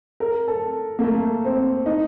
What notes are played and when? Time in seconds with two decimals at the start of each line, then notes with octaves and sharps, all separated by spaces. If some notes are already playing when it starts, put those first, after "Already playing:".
0.20 A#4
0.48 A4
0.99 A#3
1.04 A3
1.45 C4
1.86 D#4